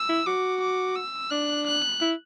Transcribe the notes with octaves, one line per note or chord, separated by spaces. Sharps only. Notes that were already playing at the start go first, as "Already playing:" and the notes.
Already playing: E6
E4
F#4 D6
D6
E6
D4 F#6
F#6
E4